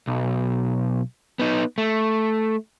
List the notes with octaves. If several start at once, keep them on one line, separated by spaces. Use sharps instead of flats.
B1
B3 D#4
A3